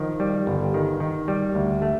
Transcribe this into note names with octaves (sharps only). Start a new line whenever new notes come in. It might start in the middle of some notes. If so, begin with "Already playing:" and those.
Already playing: D#3 F3
G3
G1
D#3
D#3
G3
D2
A3